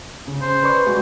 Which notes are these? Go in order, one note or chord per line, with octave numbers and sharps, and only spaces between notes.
C#3
C5
B4 D5 C#6
G#3 F#4